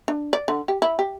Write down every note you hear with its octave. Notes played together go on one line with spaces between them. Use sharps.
D4
D5
D3
G4
E4
G4